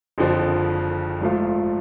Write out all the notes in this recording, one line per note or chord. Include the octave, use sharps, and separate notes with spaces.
F#1 F2 D3 F3
G#1 G#2 F3 A3 F4